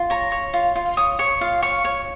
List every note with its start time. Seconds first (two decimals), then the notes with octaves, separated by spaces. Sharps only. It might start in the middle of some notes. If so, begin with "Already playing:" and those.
Already playing: F4
0.10 C#5 A#5
0.32 C#5
0.54 F4
0.75 F4
0.97 C#5 D#6
1.19 C#5 C#6
1.41 F4 F5
1.62 C#5 C#6
1.85 C#5